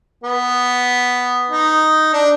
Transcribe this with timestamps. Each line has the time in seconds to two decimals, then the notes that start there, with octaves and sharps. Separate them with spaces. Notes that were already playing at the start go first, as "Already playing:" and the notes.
0.24 B3
1.51 D#4
2.13 D4